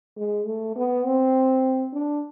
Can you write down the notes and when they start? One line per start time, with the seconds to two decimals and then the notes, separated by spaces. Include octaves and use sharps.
0.16 G#3
0.46 A3
0.76 B3
1.05 C4
1.93 D4